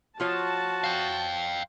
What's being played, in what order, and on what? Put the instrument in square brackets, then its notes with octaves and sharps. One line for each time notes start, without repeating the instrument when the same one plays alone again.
[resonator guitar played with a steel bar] F3 F4 C#5 [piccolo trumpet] F#4 [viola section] A5
[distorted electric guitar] F5 G5